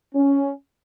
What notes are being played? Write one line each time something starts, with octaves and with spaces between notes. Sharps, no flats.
C#4